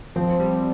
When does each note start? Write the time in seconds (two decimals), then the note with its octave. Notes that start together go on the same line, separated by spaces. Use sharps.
0.16 F3 C4
0.40 G3